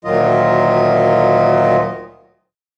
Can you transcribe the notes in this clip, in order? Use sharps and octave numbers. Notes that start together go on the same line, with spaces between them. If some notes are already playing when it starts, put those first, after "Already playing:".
D2 A#2 D#3 F#3 F4 D#5